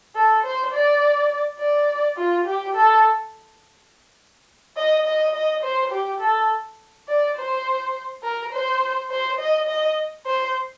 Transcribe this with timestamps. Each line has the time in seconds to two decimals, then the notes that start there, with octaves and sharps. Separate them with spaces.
0.15 A4
0.44 C5
0.73 D5
1.59 D5
2.17 F4
2.46 G4
2.75 A4
4.77 D#5
5.06 D#5
5.35 D#5
5.63 C5
5.92 G4
6.21 A4
7.08 D5
7.37 C5
8.23 A#4
8.53 C5
9.10 C5
9.39 D#5
9.68 D#5
10.26 C5